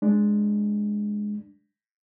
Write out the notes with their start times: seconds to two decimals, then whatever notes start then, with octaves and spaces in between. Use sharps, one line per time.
0.02 G#3 D4